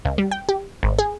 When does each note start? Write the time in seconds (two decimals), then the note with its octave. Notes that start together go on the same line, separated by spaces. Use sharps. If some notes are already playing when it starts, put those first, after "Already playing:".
0.05 C#2
0.18 G3
0.31 G5
0.49 G4
0.83 G#1
0.99 G#4